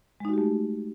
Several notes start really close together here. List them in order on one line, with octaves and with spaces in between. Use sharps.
G#3 D#4 F#4 G4 A3